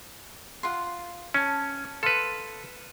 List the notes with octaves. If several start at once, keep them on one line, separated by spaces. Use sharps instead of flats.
F4 F#5 C6
C#4 G#5 A5
A4 B4 F5 C6